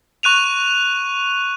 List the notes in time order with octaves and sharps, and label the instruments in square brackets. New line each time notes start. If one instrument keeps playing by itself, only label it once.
[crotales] C#6 F#6 D#7 F7